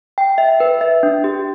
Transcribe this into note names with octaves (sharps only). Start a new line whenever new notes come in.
G5
E5
B4
E5
D4
G4